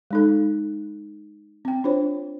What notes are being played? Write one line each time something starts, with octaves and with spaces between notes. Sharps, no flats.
G#3 D#4 A4
C4 G5
D4 F4 C5 C#5